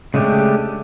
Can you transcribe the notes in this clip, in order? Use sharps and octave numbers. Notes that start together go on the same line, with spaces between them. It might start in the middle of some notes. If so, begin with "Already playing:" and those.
C#3 G#3 A3 D4 G4